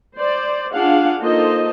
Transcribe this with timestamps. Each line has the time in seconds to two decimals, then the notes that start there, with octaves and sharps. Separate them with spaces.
0.16 C5 D5
0.74 D4 F4 G#4 F5 F#5
1.20 A#3 D#4 F4 A4 C5 D#5